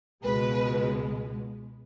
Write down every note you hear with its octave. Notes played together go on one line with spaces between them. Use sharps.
C#2 B2 G#3 B4